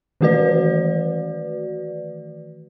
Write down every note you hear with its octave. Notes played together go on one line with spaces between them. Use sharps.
D#3 E3 A3 F#4 B4 D5